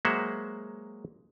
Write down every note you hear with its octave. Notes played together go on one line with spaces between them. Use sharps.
F#3 G#3 A#3 C5 E5 F#5